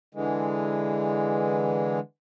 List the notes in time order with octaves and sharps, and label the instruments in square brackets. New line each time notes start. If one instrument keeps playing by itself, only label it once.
[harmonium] D3 E3 G#3